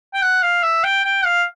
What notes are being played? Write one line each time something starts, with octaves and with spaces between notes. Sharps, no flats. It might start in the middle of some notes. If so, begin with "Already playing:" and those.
G5
F#5
F5
E5
G5
G5
F5